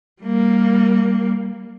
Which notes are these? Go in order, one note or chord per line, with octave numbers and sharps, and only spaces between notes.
G3 A#3